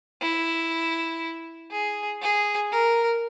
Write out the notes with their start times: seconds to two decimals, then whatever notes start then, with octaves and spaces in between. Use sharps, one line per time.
0.22 E4
1.71 G#4
2.22 G#4
2.71 A#4